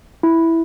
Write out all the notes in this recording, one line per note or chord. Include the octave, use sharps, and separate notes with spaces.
E4